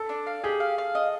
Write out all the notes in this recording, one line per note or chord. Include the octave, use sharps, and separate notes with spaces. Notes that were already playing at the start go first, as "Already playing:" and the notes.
Already playing: A4
D4
F5
G4 G#4
F5
F5
D#5